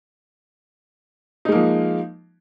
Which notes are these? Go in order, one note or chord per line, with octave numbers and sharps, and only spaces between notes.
F3 G#3 A#3 D#4